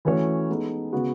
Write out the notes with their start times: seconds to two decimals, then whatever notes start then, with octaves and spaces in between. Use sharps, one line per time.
0.05 E3 A3 C#4 F#4 C#5
0.49 G#3 B3 D#4 A4
0.92 C#3 G#3 B3 F#4